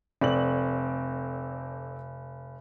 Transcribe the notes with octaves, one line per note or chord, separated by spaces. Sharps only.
F1 C4 A4 D5 F#7